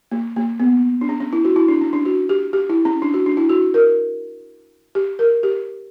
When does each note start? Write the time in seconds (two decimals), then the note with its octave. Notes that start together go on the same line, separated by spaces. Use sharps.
0.12 A#3
0.36 A#3
0.60 B3
1.01 D4
1.09 C#4
1.20 C#4
1.33 E4
1.45 F#4
1.56 E4
1.68 D4
1.81 C#4
1.93 D4
2.05 F#4
2.29 G4
2.53 G4
2.69 E4
2.85 C#4
3.02 D4
3.14 F#4
3.26 D4
3.37 E4
3.50 F#4
3.74 A#4
4.95 G4
5.19 A#4
5.43 G4